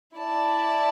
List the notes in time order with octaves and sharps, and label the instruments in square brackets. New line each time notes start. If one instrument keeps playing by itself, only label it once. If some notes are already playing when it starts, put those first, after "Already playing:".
[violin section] E4 D5 A5